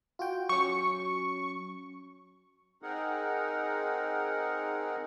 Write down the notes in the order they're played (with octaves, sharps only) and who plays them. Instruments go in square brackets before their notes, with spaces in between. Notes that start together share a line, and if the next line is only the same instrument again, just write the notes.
[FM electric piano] F4 F#4 G5
[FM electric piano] F#3 C#4 [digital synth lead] C#6
[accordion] C4 D#4 G#4 A#4 F#5